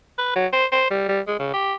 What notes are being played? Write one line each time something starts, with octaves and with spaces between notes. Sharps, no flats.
B4
F#3
C5
C5
G3
G3
G#3
C#3
G4